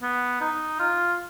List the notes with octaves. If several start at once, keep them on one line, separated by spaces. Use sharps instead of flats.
B3
D#4
F4